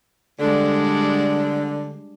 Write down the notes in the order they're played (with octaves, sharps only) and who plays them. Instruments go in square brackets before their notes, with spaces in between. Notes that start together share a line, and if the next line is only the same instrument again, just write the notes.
[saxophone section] D3 [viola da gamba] G3 G#3 D4